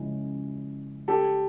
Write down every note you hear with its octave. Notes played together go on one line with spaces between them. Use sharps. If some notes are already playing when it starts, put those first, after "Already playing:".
Already playing: C#3 F3 G#3 C#4 E4
G4 A4